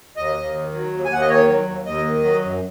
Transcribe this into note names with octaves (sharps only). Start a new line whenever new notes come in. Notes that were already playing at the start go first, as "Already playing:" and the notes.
D#2 D#5
D#2
D#3
F#3
D#2
G#5
D#2 F#5
D#5
D#3 C#5
F#3
D#2
D#2 D#5
D#3
F#3
F#2